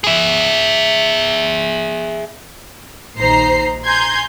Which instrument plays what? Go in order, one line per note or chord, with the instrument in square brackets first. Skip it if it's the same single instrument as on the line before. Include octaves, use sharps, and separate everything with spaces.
[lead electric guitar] G#4 E5
[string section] A#1 D#2 D#4 C5 A#5 C7
G#5 A#5 C6 G6 G#6